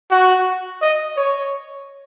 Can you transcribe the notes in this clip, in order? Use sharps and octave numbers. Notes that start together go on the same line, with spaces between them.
F#4
D#5
C#5